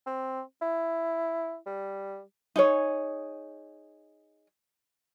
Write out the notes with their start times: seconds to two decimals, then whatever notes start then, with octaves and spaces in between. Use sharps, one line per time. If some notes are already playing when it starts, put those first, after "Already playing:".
0.07 C4
0.62 E4
1.66 G3
2.56 D#4 G#4 C#5